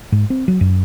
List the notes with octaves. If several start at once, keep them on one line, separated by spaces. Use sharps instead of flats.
G#2
C4
F#3
F#2